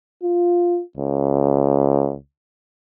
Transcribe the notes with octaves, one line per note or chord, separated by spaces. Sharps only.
F4
C#2